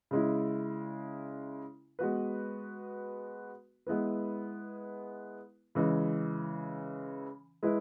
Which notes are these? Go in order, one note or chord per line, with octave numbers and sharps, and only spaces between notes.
C#3 G#3 E4
G#3 B3 F#4 B4
G#3 B3 E4 B4
C#3 E3 G#3
G#3 E4 B4